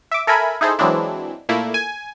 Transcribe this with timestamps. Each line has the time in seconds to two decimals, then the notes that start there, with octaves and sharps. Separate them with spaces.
0.11 E5 D6
0.27 A4 A#4 E5 G#5 B5
0.61 D#4 E4 G#4 A4 C5
0.79 E3 F#3 G#3 C4 D4 E4
1.49 A#2 A3 A#3 E4
1.74 G#5